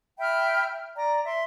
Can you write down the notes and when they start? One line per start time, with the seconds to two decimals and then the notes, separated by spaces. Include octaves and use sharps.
0.19 E5 G5 B5 F6
0.96 D5 A#5
1.25 E5 C6